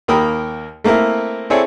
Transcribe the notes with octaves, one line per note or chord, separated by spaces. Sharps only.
D#2 A#3 A#4 G5 B5 D#6
A3 A#3 C4 E4 A#4
C4 E4 G#4 A4 C#5 D5